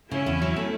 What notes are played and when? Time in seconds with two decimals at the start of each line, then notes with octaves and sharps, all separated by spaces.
0.11 C#3 C#4 E4
0.26 E2
0.42 F#3
0.56 A3